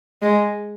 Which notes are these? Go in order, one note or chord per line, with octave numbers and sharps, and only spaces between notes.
G#3